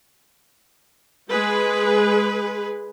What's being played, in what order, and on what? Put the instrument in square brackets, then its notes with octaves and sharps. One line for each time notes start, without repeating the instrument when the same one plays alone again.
[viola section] G#3 G#4 B4